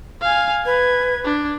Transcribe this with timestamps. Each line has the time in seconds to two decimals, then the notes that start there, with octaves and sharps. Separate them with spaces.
0.22 F5 G#5
0.65 B4 G#6
1.25 D4